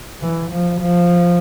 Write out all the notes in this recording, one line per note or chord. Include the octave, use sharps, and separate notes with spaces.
E3
F3
F3